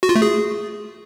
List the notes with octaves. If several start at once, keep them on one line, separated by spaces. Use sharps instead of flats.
F#4
F4
A3
G#4